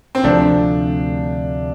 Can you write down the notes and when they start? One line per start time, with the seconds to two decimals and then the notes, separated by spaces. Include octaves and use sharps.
0.15 C4
0.24 D2 C3 F3 A3 D4